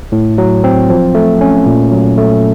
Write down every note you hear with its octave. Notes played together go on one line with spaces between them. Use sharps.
A2
F#3
C4
F3
A3
C#4
A#2
F#3
A3